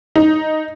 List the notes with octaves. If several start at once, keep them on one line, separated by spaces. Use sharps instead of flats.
D#4